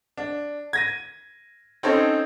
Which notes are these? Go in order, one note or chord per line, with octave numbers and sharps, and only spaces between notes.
D4
G#6 A#6 D#7
C4 C#4 D#4 A4 C5 C#5